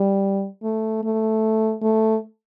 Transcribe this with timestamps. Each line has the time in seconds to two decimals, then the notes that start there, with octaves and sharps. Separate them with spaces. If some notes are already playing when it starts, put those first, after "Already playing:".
Already playing: G3
0.63 A3
1.04 A3
1.82 A3